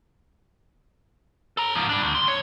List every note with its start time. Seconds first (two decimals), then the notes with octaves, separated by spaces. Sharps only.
1.57 A4 A#5
1.75 G#2 F3
1.89 G3 D4
2.02 D2
2.15 C6
2.28 C#5